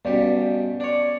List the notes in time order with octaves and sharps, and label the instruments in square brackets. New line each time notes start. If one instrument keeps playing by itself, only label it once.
[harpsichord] G2 B2 G4 [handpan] B3 C#4 [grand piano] D5
[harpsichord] D4 C#5 [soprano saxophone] D5